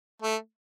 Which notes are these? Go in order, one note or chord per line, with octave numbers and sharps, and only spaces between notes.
A3